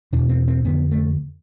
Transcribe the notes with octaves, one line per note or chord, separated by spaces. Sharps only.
E2 B2 D4
C4
C4
F2 D3 B3
A3